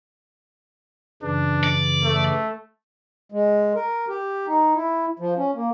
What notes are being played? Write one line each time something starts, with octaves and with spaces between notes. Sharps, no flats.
F#2 C#3 E3 D4
D5
A3
G#3
A#4
G4
D#4
E4
F3
C#4
A#3